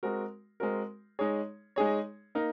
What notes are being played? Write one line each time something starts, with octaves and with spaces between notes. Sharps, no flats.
G#3 C4 F#4 A#4
G#3 C4 F#4 A#4
G#3 D#4 G#4 C#5
G#3 D#4 G#4 C#5
A#3 D#4 A#4